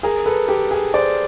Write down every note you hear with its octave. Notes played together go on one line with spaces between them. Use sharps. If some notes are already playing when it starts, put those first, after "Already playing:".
G#4 A#4
A4 B4
G4 A4
G#4
C5 D5